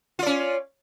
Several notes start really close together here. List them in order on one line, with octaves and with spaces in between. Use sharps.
F4 D5 C#4